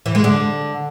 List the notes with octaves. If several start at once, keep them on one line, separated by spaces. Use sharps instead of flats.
E3
G#3
D3